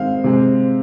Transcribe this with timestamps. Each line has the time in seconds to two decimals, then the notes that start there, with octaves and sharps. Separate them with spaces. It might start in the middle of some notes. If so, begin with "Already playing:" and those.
Already playing: D#3 G#3 C4 F5
0.24 C3 G#3 C4